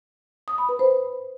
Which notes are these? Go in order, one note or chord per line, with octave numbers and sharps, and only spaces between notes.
D#6
B5
B4
C5